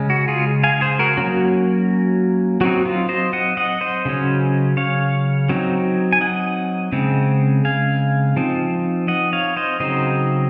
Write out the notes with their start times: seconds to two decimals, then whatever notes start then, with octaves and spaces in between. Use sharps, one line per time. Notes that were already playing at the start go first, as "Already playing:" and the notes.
Already playing: C#3 G#3 C#4
0.10 F#4
0.28 F4 G#4
0.63 F5 G#5
0.81 G#4 C5
0.99 F#4 A#4
1.17 F#3 A#3 C#4 F#4
2.61 F#3 C4 D#4 F#4
2.85 F4
3.09 C5 D#5
3.33 D#5 F#5
3.57 D#5 F#5
3.81 C5 D#5
4.05 C#3 F#3 C#4
4.77 C#5 F5
5.49 F#3 C4 D#4
6.13 G#5
6.21 D#5 F#5
6.93 C#3 G#3 C4
7.65 F5 G#5
8.36 F3 C4 D#4
9.08 D#5 F#5
9.33 C#5 F5
9.57 C5 D#5
9.80 C#3 F#3 C4 D#4 C5 D#5